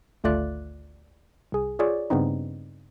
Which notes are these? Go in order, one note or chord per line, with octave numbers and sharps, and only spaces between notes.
G#1 D2 A3 F4 D5 F#6
C2 G#4
F4 G#4 C#5 D5
G2 C#3 B3 C4 D#4